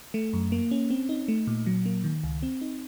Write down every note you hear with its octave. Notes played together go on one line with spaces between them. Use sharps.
A3
F#2
A#3
C#4
C4
D#4
A3
A#2
F#3
A#3
D#3
C#2
C4
D#4